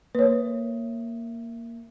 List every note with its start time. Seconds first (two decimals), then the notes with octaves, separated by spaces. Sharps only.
0.15 A#3 B4 C#5